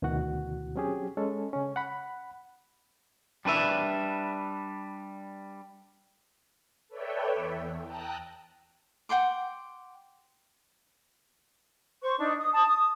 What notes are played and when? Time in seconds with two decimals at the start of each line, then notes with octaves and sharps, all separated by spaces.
0.02 D2 B2 D#3 E3 F#4 F#5
0.76 F#3 C4 C#4 G4 G#4
1.17 G#3 C#4 A4
1.53 C#3 C#4
1.76 F#5 B5
3.45 G3 D4 B4 E5
6.88 A4 B4 C#5 D5 E5 G5
7.35 E2
7.84 G5 A5 A#5 D#6 E6 F#6
9.09 F#5 G5 C6 D6
12.01 C5 C#6
12.19 D4 D#4
12.37 D#6
12.53 A5 D#6
12.68 D#6